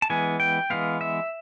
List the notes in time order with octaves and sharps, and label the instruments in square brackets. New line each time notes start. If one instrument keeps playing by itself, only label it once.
[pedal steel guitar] A5
E3 G#3 B3 G#5
G5
E3 G#3 B3 F5
E5